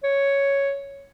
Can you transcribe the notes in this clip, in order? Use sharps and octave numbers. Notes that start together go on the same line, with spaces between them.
C#5